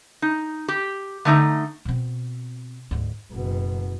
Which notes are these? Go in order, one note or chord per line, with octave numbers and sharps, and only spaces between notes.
D#4
G4
D3 A3 D#4 A#5
B2 C4
D2 G#2
F#1 B2